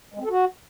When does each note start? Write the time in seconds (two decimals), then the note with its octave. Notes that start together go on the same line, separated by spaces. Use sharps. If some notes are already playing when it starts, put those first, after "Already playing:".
0.14 G#3
0.19 C4
0.25 A4
0.30 F#4